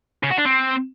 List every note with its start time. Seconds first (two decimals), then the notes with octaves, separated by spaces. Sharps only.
0.23 C#3
0.31 F#4
0.38 D4
0.45 C4